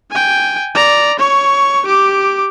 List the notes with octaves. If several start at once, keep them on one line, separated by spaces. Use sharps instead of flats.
G5 G#5
D5 A#5
C#5 C#6
G4 D6